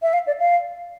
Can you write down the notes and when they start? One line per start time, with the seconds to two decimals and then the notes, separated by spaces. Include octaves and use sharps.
0.02 E5
0.13 F5
0.26 D5
0.39 F5